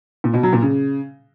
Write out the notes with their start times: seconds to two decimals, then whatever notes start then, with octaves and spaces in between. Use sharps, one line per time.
0.24 A#2
0.34 B2
0.43 F#3
0.53 A#2
0.62 C#3